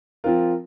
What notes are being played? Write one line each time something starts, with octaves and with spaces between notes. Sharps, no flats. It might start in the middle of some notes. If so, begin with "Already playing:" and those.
F3 C4 F4 A#4